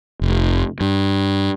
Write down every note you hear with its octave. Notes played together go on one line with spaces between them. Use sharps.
F1
G2